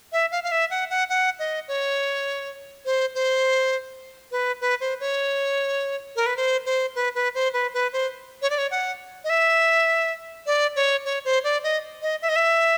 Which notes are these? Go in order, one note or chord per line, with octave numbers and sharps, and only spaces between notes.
E5
F5
F5
E5
F#5
F#5
F#5
D#5
C#5
C5
C5
B4
B4
C5
C#5
A#4
B4
C5
C5
B4
B4
C5
B4
B4
C5
C#5
D5
C#5
F#5
D#5
E5
D5
C#5
C#5
C5
D5
D#5
D#5
E5
D#5
E5